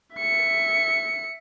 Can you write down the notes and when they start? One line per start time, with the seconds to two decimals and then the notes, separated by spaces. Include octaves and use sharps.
0.16 E5 C#7